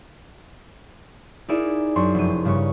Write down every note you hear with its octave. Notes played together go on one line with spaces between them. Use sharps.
D#4 E4 G#4 A#4 D5 E5
F#2 D4 C6 C#6
F1 D#7
G2 C#3 A#5 C#6